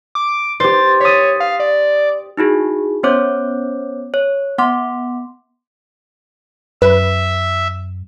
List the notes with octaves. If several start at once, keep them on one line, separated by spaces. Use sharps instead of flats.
D6
G4 C5 A6
C#5 D#6 A6 B6
F5
D5
D#4 E4 F#4 G#4
B3 C#4 C5 C#5 D6 G6
C#5
B3 F#5 C6 D6
F#2 B4 E5